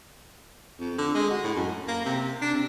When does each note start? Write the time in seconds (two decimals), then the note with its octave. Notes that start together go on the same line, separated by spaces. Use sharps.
0.80 F2
0.98 D3
1.15 G#3
1.31 F#4
1.44 A2
1.57 F#2
1.88 A#3
2.05 C3
2.42 D4
2.55 C3